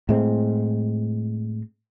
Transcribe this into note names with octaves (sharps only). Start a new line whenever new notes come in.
A2 G#3 C4